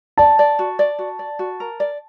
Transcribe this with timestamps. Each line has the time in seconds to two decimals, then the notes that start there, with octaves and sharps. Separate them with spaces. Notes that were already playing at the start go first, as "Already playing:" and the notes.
0.18 D5 A5
0.39 D5
0.59 F#4
0.79 D5
0.99 F#4
1.19 D5
1.39 F#4
1.60 A#4
1.80 D5